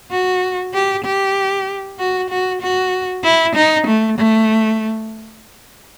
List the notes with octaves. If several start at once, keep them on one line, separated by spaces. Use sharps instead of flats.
F#4
G4
G4
F#4
F#4
F#4
E4
D#4
A3
A3